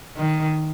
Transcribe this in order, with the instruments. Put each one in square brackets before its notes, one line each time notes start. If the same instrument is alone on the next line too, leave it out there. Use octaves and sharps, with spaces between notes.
[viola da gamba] D#3